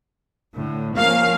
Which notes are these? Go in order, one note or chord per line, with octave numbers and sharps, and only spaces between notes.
A2 D3
F3 A#3 C#4 F5